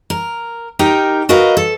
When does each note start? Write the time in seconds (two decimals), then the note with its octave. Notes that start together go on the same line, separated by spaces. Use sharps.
0.10 A#4
0.79 D#4 G4 A#4 G5
1.29 F#4 A#4 B4 D#5 F5
1.57 A4